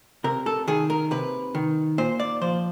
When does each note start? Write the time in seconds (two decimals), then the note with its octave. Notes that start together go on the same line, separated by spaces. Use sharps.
0.24 C3 A#4
0.46 A4
0.68 D#3 G#4
0.90 A#4
1.11 C3 B4
1.55 D#3
1.98 A#2 C5
2.20 D5
2.41 F3 C5